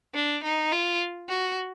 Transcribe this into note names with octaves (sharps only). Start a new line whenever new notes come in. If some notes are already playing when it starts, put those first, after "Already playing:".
D4
D#4
F4
F#4